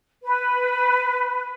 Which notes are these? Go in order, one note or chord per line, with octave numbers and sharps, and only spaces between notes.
B4